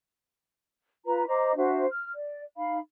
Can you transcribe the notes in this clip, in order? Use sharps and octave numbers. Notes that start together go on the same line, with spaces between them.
F4 B4 A#5
C5 D#5 A#5 D6
D4 F#4 C5 E5
F6
D5
D#4 F5 B5